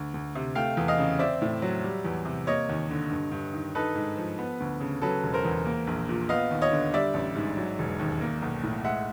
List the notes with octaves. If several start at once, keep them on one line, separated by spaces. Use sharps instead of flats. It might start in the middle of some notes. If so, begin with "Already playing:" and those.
Already playing: D2
D2
C3
A3 F5 G5
E2
D#5 F5
C#3
C4 D5 E5
A2
F#3
G3
E2
C3
A#3 C#5 D#5
D#2
D3
G2
G2
D#3
D#4 A4 B4
G#2
F3
B3
D2
C#3
F#3 A4 B4
E1
A#4 C5
E2
A#3
A#1
A#2
B3 D#5 F5
D#2
C#5 D#5
D3
G3 D5 E5
A1
G#2
F#3
E1
D#2
A#3
B1
A2
G#3 E5 F#5